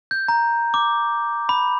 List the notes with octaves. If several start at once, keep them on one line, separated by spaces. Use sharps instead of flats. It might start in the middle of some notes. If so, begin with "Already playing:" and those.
G6
A#5
D6
B5